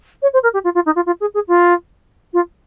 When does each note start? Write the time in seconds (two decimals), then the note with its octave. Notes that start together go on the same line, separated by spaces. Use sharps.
0.22 C#5
0.33 C5
0.43 A#4
0.53 G4
0.64 F4
0.75 F4
0.86 D#4
0.96 F4
1.06 F4
1.21 G#4
1.34 G#4
1.48 F4
2.33 F4